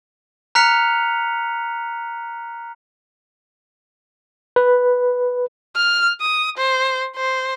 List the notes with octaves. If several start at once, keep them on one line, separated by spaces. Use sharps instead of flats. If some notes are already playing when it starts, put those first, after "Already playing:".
A#5 F6 F#6 B6 C#7 F7
B4
F6
D#6
C5
C5